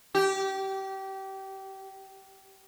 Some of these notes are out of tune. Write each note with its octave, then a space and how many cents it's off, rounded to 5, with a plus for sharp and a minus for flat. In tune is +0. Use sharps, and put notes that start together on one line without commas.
G4 -25